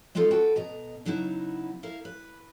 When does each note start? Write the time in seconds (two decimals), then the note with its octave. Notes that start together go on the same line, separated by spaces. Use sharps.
0.15 G#3 C4 D#4 F4 A4
0.31 F#4 A4 B4 G5
0.56 B2 D#5 A#5
1.05 C#3 F#3 B3 D#4 E4
1.83 E4 A#4 F5
2.05 B4